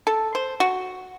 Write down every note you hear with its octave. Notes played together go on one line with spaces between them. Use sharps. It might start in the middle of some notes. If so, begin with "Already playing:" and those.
A4
C5
F#4